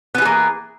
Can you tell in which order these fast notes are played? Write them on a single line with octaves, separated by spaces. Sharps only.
B3 E3 G#4 A#3